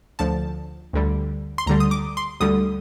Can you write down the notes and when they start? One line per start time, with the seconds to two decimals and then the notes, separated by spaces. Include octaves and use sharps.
0.19 D2 D3 F3 A5
0.93 D2 D3 G3
1.58 C6
1.66 D2 D3 G3 A#5
1.80 D#6
1.91 D6
2.17 C6
2.40 D2 D3 G3 D#6